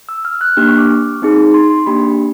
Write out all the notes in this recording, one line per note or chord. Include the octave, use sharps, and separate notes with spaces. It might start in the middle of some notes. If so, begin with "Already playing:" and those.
E6
F6
F#6
A#3 D4 G4 F6
C#6
D6
C4 D#4 G#4
C6
C6
A#3 D4 G4 B5